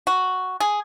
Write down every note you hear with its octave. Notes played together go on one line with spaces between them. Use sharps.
F#4
G#4